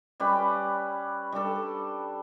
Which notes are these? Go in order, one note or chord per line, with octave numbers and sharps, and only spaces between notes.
G3 C#4 G4 B4
G3 D4 A4